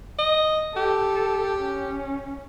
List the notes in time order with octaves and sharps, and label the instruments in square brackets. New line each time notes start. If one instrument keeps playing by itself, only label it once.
[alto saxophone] D#5
[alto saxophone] G4 [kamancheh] A4
[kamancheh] C#4